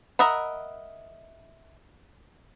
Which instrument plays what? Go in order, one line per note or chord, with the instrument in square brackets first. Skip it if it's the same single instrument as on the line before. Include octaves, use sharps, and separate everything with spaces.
[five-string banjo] A#4 D#5 E5 F#5 B5